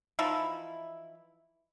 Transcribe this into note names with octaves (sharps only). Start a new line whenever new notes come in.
E3 F3 D#4 E4